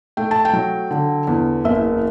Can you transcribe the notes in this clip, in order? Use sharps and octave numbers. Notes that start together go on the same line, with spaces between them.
A3 G5
A5
G5
F#3
D3
E2
F#1 E5